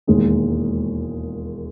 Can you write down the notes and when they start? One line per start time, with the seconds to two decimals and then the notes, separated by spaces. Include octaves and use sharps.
0.07 E1 D#2 D#3 G#3